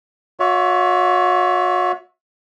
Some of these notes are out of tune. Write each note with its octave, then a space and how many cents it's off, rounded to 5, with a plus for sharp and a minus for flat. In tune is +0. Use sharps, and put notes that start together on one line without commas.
F#4 -40 C#5 +35 E5 +0